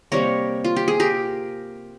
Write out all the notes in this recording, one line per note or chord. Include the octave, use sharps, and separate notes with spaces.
C3 G3 A#3 A#4 C#5
F4
G4
G#4
G4 A#4